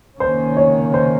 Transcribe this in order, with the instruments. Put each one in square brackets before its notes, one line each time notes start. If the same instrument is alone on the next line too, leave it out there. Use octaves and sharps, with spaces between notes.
[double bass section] C#2 C3 D#3 A#3 C#4 [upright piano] C5
[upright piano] C#5
C5